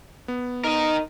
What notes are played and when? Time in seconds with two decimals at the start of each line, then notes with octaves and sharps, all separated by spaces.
0.28 B3
0.64 D#4 A#4 D#5